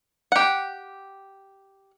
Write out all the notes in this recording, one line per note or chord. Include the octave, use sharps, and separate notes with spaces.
G4 F#5